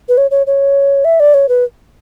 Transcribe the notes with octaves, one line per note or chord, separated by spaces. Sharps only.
B4
C#5
C#5
C#5
E5
D5
C#5
B4